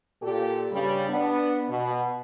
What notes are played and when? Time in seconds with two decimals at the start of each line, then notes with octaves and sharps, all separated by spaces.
0.22 A#2 G4 A4
0.71 G2 C#3 G3
1.09 B3 D4
1.69 B2